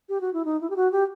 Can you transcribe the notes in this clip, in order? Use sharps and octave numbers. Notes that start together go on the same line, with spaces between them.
G4
F#4
E4
D#4
E4
G4
F#4
G4